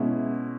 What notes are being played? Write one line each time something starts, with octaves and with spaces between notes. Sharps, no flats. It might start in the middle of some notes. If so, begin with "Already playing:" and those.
Already playing: B2 G#3 C#4 E4